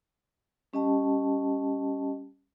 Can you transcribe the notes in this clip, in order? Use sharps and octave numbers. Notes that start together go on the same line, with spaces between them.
G3 C#4 G4 D#5 G5 A5